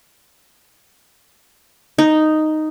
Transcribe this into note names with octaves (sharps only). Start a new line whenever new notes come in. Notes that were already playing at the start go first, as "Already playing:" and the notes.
D#4